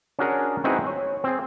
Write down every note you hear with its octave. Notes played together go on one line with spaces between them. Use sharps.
C#4 D4 F#4 G#4 A#4
C4 D#4 E4 F#4 G#4 B4
C#5
C4 G#4